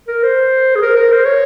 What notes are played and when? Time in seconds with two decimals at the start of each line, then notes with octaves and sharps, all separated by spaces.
0.08 A#4
0.24 C5
0.75 G#4
0.82 A#4
0.97 A#4
1.12 C5
1.26 C#5